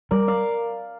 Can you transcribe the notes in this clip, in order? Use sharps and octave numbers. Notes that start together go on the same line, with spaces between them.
G3 A#4 D5
D5 F5